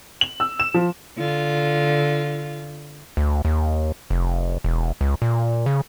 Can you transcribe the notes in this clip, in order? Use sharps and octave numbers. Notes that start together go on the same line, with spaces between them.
F#7
E6
E7
F3
D3 F4
D2
D#2
F1
E1
C#2
A#2
C#3